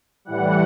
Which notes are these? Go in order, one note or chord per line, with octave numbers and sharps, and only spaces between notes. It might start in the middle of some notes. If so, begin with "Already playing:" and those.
A2 E3 G3 F#5